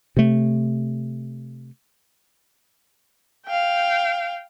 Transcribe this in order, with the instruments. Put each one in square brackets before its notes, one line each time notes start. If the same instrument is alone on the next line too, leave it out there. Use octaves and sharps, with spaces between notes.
[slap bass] C3 A3
[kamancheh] F5 G5